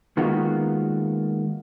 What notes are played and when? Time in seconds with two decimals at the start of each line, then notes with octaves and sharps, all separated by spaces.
0.17 D#3 G#3 A#3 B3 F4 F#4